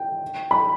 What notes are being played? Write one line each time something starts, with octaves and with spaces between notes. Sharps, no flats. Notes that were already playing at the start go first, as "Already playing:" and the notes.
Already playing: G5
B5